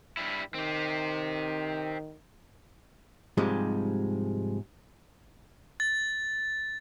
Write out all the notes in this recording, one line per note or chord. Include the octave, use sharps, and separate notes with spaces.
G2 G3 E4
D#3 C4 G4
G#2 C3 F3 G3 G#3
A6